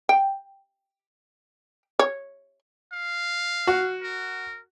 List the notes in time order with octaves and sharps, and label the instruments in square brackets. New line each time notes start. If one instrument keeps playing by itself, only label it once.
[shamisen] G5
C#5
[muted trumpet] F5
[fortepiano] F#4
[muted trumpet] A#4